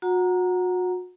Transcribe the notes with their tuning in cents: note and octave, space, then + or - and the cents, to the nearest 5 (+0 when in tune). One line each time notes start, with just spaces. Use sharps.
F#4 -35 F#5 +0 A#5 +0